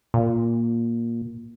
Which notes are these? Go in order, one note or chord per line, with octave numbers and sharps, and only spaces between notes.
A#2